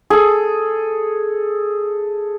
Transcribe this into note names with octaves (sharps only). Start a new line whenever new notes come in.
G#4 A4